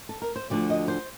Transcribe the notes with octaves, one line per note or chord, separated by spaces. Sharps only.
A4
A#4
C5
D2 D3 F3 D5
D#5
C5